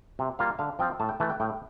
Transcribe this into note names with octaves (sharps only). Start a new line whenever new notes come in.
C3
G3 A#3 F4 F5
D3 F5
F3 C4 F4 G5
A2 A5
G5
E3 A3 A5
G5
A2 G5